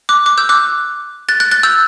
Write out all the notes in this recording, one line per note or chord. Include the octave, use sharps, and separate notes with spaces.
D6 F#6
D6 F#6
E6 G6
D6 F#6
F#6 A6
F#6 A6
F#6 A6
E6 G6